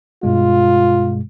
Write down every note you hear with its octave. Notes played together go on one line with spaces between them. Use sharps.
G2 B2 G#3 F4